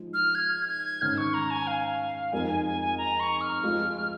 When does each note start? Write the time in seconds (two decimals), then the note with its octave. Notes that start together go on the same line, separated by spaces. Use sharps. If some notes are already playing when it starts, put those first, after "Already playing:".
Already playing: F3 G#3 D#4
0.14 F6
0.35 G#6
0.68 G#6
1.02 G#2 D#3 C#4 F6
1.18 C#6
1.34 A#5
1.51 G#5
1.67 F5
2.33 F2 F3 G#3 D#4 A#4 G#5
2.48 G#5
2.66 G#5
2.81 G#5
2.98 A#5
3.20 C#6
3.41 F6
3.63 F3 G#3 F4